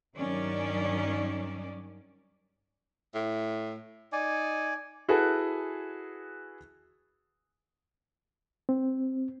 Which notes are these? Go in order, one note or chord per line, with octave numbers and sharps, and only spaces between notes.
G2 D#3 F#3 C#4 D5
A2
D#4 D5 G#5
E4 F#4 G#4 A4 B4
C4